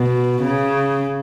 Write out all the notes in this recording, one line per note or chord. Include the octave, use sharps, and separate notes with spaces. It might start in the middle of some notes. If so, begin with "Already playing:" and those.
Already playing: B2
C#3